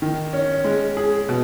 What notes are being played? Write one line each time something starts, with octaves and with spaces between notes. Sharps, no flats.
D#3
C#4
G#3
G#4
B2